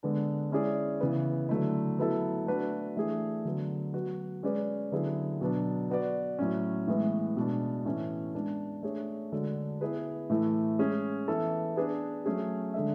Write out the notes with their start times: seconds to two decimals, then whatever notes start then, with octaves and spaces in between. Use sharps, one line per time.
0.03 D3 G#3 B3 D4
0.51 G#3 C#4 E4 G#4 D5
1.01 C#3 E3 B3
1.49 D3 F#3 A3 E4
1.99 F#3 B3 E4 A4
2.47 A3 D4 F#4 B4
2.96 E3 A3 D4 G#4
3.45 D3 F#3 B3
3.94 F#3 B3 F#4
4.43 G#3 C#4 G#4 B4 D5
4.92 D3 F#3 B3 E4 G#4
5.41 B2 F#3 B3 D4
5.90 B3 F#4 B4 D5
6.39 A2 F#3 C#4
6.87 A2 E3 G#3 B3
7.37 B2 G#3 D4
7.85 A2 E3 A3 C#4
8.35 G#3 B3 D4
8.83 A3 D4 G#4 C#5
9.32 D3 G#3 D4 F#4 A4
9.81 B3 E4 G#4 B4
10.30 A2 E3 A3
10.79 G#3 C#4 G#4
11.28 E3 B3 E4 A4
11.76 B3 D4 G#4 B4
12.26 F#3 A3 C#4 G#4
12.74 D3 G#3 D4 A4 E5